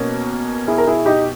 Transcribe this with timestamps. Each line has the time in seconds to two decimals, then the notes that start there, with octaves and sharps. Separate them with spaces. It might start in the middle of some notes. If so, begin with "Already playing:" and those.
Already playing: B2 A#3 C#4
0.68 E4 G#4
0.78 A#4
0.87 E4 G#4
1.06 D#4 G4